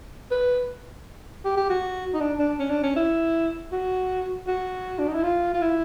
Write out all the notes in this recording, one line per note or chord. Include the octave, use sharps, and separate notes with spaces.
B4
G4
G4
F#4
D#4
D4
D4
C#4
D4
C#4
E4
F#4
F#4
D4
D#4
E4
F4
F4
E4